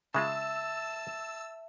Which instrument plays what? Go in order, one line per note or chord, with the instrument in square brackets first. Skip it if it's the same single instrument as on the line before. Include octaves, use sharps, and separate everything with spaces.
[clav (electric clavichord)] C#3 G#3 F4 [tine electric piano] E5 [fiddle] A5 [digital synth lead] E6